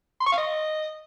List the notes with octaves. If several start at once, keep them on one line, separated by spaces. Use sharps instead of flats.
C6
C#6
F5
D#5